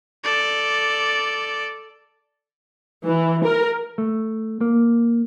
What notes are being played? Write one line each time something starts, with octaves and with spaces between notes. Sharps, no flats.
A4 D5
E3
A#4
A3
A#3